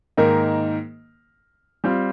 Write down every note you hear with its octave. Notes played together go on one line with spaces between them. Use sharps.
G#2 D#3 A#3 D#4 A#4
G3 C4 F4